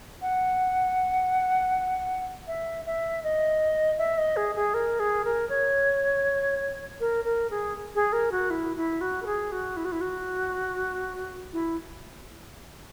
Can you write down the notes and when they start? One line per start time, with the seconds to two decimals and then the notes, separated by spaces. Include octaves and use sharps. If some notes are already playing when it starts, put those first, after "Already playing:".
0.22 F#5
2.47 E5
2.86 E5
3.24 D#5
3.98 E5
4.18 D#5
4.36 G#4
4.55 G#4
4.74 A#4
5.00 G#4
5.25 A#4
5.49 C#5
7.00 A#4
7.25 A#4
7.51 G#4
7.95 G#4
8.13 A#4
8.32 F#4
8.50 E4
8.77 E4
9.01 F#4
9.22 A#4
9.26 G#4
9.52 F#4
9.77 E4
9.85 F#4
9.92 E4
10.01 F#4
11.53 E4